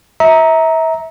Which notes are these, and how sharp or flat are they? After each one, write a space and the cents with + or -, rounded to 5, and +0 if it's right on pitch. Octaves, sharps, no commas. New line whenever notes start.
E5 -30 A#5 +0